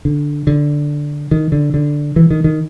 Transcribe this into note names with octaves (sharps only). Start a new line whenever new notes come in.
D3
D3
D#3
D3
D3
E3
D#3
D#3